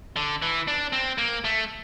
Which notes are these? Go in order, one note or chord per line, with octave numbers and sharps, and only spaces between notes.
D3
E3
D4
C4
A#3
A3